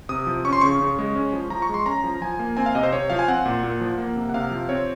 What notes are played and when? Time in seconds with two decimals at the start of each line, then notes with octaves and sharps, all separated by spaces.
0.09 C3 D#6
0.27 F3
0.45 C#4 C#6
0.53 C6
0.61 C#3 C#6
0.81 C#3
0.99 G#3
1.15 C#4
1.33 F3
1.50 F3 A#5
1.62 C#6
1.69 G#3 C6
1.86 C#4 A#5
2.04 F3
2.21 F3 G#5
2.39 A#3
2.57 C4 G#5
2.66 F5
2.75 C3 D#5
2.83 C5
2.93 C3 C#5
3.10 F3 F5
3.19 G#5
3.28 C4 F#5
3.45 A#2
3.63 A#2
3.81 F3
3.98 A#3
4.16 C3
4.29 F#5
4.34 C3 F5
4.51 F3
4.69 C4 C#5